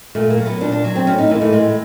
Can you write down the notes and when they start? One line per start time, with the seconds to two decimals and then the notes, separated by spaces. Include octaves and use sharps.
0.15 A#2 A3
0.30 A#3
0.37 F#3
0.46 B3
0.61 A#2 D4
0.72 D4
0.84 F#3
0.96 C4
1.07 A2 C#4
1.18 D#4
1.30 E3 G#3 A#3
1.42 A3
1.53 A2 G#3